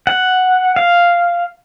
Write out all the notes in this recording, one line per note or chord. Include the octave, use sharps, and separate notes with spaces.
F#5
F5